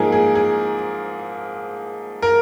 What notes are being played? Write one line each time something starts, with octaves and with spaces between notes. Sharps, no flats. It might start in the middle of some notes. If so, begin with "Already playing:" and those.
Already playing: G#2 F3 A#3 D#4 G#4 A#4
G#4
G#4
A#4